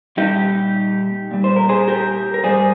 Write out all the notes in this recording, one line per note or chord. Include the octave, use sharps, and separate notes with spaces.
A#2 G3 D#4 G4
A#2 G3
C5
A#4
G#4 C5
G4 A#4
A#4
G#2 D#3 G3 G#4 C5